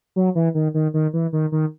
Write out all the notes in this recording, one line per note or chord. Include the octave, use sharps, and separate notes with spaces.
F#3
E3
D#3
D#3
D#3
E3
D#3
D#3